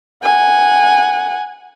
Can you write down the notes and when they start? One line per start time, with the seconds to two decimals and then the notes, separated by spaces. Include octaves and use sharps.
0.23 F#5 G#5